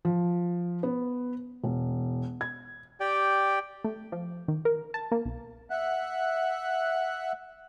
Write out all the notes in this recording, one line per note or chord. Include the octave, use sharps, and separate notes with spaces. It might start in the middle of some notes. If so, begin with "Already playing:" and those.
F3
B3
E1
G#6
G4 D5 G5
A3
F3
D#3
A#4
A5
A#3
B1
E5 F#5 F#6